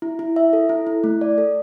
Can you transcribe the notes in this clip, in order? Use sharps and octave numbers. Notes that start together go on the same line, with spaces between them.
E4
E4
E5
A4
E4
E4
A3
D5
A4